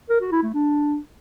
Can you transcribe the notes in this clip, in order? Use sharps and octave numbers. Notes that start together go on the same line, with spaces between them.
A#4
F#4
E4
A3
D4